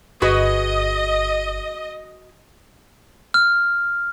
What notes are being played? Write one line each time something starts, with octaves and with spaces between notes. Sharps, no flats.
G1 F#4 G#4 B4 D#5
F6